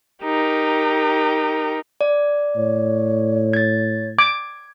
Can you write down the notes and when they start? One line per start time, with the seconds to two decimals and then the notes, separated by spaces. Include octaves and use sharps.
0.23 D#4 G4 A#4
2.01 D5
2.56 A2 C#5
3.53 G#6 A6
4.19 D6 G#6